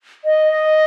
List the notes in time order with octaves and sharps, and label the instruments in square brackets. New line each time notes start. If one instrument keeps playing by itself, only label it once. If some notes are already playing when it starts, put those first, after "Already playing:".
[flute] D#5